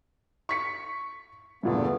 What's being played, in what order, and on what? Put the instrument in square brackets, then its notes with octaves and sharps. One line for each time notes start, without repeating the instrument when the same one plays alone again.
[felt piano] C#6 B6 C#7
[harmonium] E2 A3 B3 [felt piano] G2 A#2 D3